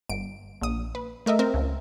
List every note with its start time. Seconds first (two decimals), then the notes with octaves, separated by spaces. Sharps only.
0.09 G1 D7
0.61 A#1 D#6
0.95 B4
1.26 A3 A#4 D#5 E5
1.39 C4 A#4
1.54 C#2